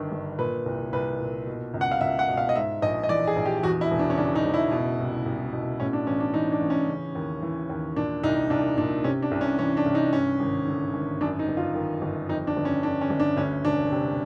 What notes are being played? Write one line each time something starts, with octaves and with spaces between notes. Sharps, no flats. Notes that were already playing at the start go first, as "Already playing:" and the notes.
Already playing: G1 G2 D#3
G1
A#2 B4
C2
C2 B4
A#2
B2
C#2
F#5
F5
C#2 E5
F#5
B2
F5
D#5
G#2 E5
A#1 D#5
D#5
E3 D5
G#4
A#1
G4
E2 F#4
E4
E1
D4
C#4
C#3 D4
D#4
E1
E4
B2
C2
C2
B2
A2 C#4
D4
A1 C#4
D4
E3 D#4
D4
A1
C#4
C#3
D#2
E3
D#2
A#2 D4
C2 D#4
C2 D4
A#2 D4
C3 C#4
D4
C2
C#4
E3 C#4
D4
C2
D#4
G2 C#4
G#1
D3
G#1
F#2 D4
D#4
G1
F4
D#3
G1
F2 D#4
D4
G1
C#4
D3 D4
C#4
G1
D4
D2 C#4
E1 D4
C3